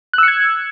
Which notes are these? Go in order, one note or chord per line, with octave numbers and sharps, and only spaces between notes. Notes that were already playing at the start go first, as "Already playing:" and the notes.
E6 F#6 G#6 C#7